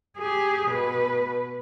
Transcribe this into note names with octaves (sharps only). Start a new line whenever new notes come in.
G4 G#4
B2 B4